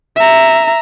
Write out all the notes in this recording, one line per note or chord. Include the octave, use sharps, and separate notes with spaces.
E5 A#5